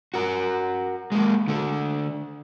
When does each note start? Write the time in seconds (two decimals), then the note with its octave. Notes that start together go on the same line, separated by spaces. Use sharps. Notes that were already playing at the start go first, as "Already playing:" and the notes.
0.14 F#4 A#4
1.12 G#3 A#3
1.48 D3 A3